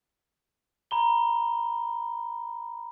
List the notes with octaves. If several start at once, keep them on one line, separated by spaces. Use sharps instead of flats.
A#5 B5 G7